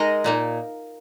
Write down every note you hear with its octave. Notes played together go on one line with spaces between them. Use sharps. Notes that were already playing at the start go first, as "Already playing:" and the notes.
Already playing: G#3 D#4 A#4 D#5
A#2 A#3 D#4